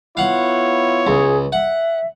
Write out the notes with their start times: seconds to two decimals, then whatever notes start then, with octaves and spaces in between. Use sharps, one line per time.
0.17 B3 E4 F4 C#5 F5 F#5
1.07 C#2 G#4
1.52 E5 F#5